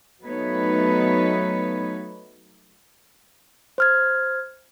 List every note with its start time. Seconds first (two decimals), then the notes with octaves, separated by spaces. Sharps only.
0.25 F#3 A3 B3 D#4 B4 C#5
3.78 C5 F6 G#6